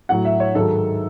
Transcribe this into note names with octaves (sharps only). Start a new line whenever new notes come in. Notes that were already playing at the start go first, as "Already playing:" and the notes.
A2 F#3 F#5
E5
C#5
G#2 D#3 F#3 A4